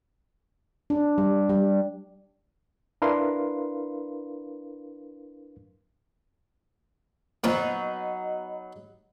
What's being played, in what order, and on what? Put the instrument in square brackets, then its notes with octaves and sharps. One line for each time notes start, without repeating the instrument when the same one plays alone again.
[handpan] D4
G3
G3
[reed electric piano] D4 E4 A#4 B4 F5 C6
[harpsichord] A#2 F3 A#3 [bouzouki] F#3 B3 D#4 [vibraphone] D#5